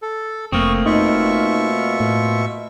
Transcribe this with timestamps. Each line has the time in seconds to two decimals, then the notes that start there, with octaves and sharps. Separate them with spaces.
0.02 A4
0.52 F1 A3 A#3 C4 C#6 D#6
0.86 B2 D#4 F4 E5 C#6
2.00 A2